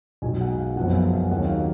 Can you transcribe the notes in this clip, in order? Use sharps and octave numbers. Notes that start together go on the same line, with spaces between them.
B1 B2 G#3 G#5
F#5
F5
F#1 F#2 F3 G#3 B3 F#5
G#5
F5
D#2 D#3 F#3 A#3 C#4 F#5
F5